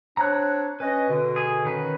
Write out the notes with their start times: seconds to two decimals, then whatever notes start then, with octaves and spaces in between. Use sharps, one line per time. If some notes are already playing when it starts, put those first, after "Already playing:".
0.17 C4 D4 C#5 A#5 F#6
0.80 C#4 B4 D#5
1.09 B2 D3
1.36 G#4 G#5
1.65 D#3 C#4 B4